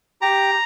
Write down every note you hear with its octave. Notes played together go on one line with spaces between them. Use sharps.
G4 A#5